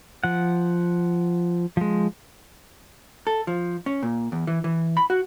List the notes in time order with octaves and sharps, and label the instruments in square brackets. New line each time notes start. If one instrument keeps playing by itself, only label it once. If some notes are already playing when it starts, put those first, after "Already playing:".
[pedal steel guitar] F3 F#5
F3 G#3
[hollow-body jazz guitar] A4
F3
C#4
A#2
E2
E3
E3
B5
F#4